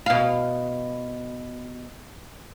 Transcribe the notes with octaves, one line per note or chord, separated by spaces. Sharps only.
B2 F5